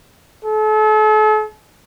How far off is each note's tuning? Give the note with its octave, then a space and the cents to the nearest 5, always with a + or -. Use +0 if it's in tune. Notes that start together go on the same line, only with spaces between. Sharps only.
A4 -40